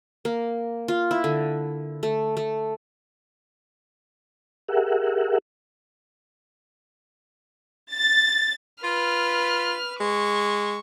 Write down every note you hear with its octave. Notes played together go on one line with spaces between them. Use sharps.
A#3
F4
E4
D3
A3
A3
G4 G#4 A#4 E5 F#5
A6
F4 B4 F6
G#3 C#6